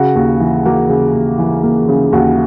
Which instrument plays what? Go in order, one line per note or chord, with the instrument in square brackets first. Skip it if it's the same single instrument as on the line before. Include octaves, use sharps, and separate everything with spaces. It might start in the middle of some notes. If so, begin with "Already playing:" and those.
Already playing: [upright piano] C#3 F#4
D#2
E3
A#3 F#4
C#3
D#2
E3
A#3
C#3
D#2 F#4